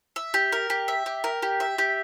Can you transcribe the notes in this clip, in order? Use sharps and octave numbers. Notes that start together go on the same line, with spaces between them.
E5
G4
A#4
G4
E5
G4
A#4
G4
E5
G4